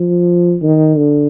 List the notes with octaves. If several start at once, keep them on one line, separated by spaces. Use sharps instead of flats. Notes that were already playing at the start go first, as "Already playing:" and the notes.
Already playing: F3
D#3
D3